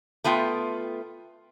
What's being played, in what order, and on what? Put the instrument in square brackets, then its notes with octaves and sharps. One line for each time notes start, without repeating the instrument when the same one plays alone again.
[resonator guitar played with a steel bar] A3 B3 F4 G5